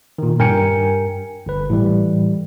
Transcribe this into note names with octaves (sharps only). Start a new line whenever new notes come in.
A#2 D#3
G2 A#4 G5 G#5 C#7
G1 B4
A2 E3 G3